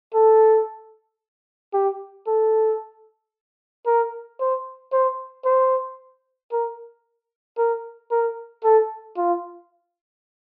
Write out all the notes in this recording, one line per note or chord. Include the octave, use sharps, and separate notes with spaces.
A4
G4
A4
A#4
C5
C5
C5
A#4
A#4
A#4
A4
F4